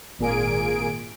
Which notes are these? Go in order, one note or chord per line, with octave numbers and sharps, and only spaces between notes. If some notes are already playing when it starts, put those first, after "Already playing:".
G#1 A#2 A#3 G#4 G#5 D7